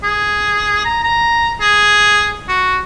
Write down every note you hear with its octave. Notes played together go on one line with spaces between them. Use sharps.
G#4
A#5
A#5
G#4
F#4